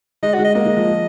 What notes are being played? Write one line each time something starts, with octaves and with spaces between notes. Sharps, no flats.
G#3 D#5
G#3 F#4
D#5
A#3 D#5
G#3
F3